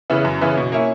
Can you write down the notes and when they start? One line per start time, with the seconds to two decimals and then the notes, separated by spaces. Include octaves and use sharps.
0.10 C#3 E3 B3 E4
0.25 F#2
0.41 C#3 E3 B3 E4
0.57 B2
0.72 A#3 C#4 E4